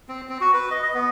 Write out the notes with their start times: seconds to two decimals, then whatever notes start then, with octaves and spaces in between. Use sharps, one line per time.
0.09 C4
0.29 C4
0.41 F#4
0.53 B4
0.71 D#5
0.82 D#5
0.94 B3